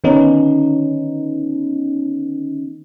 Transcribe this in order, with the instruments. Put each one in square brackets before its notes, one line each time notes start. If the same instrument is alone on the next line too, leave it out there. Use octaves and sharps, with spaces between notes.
[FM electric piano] D3 D#3 B3 C#4 D#4